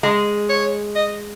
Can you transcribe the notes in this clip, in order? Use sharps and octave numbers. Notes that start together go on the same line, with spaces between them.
G#3 D#5
C#5
D#5